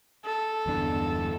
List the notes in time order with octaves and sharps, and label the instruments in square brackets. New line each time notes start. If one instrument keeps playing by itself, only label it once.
[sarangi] A4
[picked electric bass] G1 E2 D4